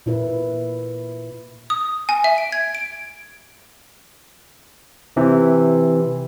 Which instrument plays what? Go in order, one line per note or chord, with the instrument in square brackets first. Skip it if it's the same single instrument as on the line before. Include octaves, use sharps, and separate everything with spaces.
[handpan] A#2 E4 B4
[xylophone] D#6
G#5
E5
D7
G#6
D7
[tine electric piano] C3 E3